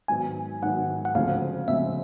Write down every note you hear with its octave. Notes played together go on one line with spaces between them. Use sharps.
G#2 D#3 F#3 B3 G#5
G#2 D#3 F#3 B3 F#5
F#5
D2 C#3 F3 G#3 C4 F5
D2 C#3 F3 G#3 C4 E5